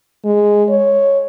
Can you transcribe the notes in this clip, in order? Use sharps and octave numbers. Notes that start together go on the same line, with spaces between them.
G#3
C#5